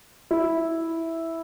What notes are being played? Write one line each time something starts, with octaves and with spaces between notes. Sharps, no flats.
E4